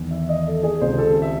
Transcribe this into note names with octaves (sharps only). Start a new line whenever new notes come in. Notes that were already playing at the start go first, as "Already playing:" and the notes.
Already playing: E2 D#3
E5
D#5
A4
G#4
C#2 C3 D#3 C5
A4
E5